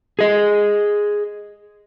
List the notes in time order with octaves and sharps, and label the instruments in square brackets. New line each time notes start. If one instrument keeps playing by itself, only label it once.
[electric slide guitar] G#4 D#5